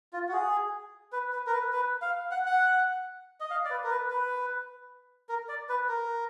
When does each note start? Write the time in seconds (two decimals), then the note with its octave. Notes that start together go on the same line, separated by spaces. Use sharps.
0.13 F4
0.29 F#4
0.33 G#4
1.13 B4
1.33 B4
1.47 A#4
1.52 B4
1.72 B4
2.02 F5
2.31 F#5
2.46 F#5
3.40 D#5
3.50 F5
3.65 D5
3.70 B4
3.84 A#4
3.90 B4
4.10 B4
5.29 A#4
5.49 D5
5.69 B4
5.89 A#4